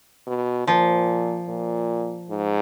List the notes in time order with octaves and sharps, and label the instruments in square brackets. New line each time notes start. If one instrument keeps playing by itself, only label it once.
[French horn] B2
[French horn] A#2 [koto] F3
[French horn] A#2
G#2